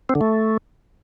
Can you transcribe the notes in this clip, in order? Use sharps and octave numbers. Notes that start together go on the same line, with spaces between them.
C4
D3
A3